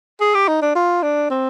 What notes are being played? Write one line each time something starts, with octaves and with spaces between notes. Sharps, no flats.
G#4
G4
D#4
D4
F4
D4
C4